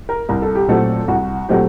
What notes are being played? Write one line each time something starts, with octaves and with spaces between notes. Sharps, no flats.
A#4
C2 A#4
A4
G4
A#2 F#3 A3 C4 A4
C2 F#4
A#2 F#3 A3 C4 G4